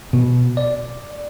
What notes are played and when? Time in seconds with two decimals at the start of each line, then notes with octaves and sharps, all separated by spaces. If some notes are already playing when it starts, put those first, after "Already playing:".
0.13 B2
0.57 D5